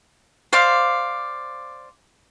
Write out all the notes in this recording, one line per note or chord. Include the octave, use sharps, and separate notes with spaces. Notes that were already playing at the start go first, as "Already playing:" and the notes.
C5 D5 F5 D6